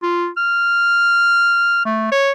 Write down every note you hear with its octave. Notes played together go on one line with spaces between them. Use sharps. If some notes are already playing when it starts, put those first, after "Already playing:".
F4
F6
A3
C#5